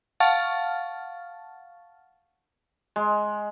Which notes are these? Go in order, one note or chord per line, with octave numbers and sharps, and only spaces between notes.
F5 F#5 A5 C#6 F6 A6
G#3